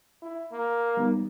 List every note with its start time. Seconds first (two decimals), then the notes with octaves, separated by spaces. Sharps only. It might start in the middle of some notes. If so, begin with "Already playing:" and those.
0.22 E4
0.52 A#3
0.97 G3 B3 D#4